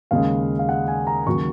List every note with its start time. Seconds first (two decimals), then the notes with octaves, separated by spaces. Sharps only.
0.11 D#2 C#3 G#3 F5
0.59 F5
0.69 F#5
0.88 G#5
1.07 A#5
1.27 D#2 C#3 F#3 C#6